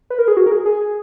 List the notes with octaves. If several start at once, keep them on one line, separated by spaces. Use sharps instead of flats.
B4
A#4
G#4
F#4
A#4
G#4
G#4
G#4